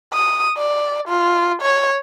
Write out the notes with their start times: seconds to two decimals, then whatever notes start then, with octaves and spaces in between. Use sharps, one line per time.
0.13 D#6
0.57 D5
1.08 F4
1.62 C#5